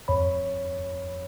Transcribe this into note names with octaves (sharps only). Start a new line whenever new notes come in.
F2 C#5 B5